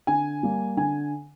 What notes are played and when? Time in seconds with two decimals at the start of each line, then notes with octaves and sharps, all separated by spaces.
0.07 D3 G#5
0.43 G3 A#3
0.77 D3 G#5